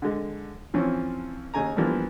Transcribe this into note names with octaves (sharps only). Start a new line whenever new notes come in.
D3 G#3
E3 F3 C4 C#4
D#2 C#3 G#5 A#5
E3 F3 G3 A#3 B3 D4